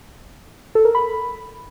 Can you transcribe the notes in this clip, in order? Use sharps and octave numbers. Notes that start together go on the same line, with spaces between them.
A4
A#4
B5